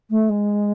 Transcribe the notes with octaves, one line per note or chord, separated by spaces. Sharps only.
A3
G#3